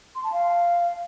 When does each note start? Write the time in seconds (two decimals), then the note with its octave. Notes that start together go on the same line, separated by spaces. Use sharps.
0.15 C6
0.24 A5
0.32 F5